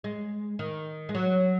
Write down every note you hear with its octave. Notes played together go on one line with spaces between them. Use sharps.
G#3
D#3
G#3
F#3